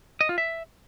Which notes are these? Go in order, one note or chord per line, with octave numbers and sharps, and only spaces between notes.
D#5
F4
E5